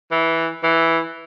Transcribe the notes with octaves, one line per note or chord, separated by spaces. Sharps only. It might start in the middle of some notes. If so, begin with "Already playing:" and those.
E3
E3